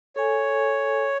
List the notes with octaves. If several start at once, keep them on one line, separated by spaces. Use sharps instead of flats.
A4 C#5 G#5